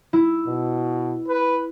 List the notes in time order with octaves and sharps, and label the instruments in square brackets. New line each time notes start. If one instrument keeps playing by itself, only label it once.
[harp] E4
[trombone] B2
B4